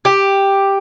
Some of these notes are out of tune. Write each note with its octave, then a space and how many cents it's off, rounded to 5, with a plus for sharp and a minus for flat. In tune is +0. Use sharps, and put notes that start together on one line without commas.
G4 +5